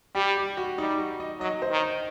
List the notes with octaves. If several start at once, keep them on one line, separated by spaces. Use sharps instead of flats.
G3 G4
G4
F#4
G3 D#4
F#4
D#5
F#3 D#5
C5
D#3
D#5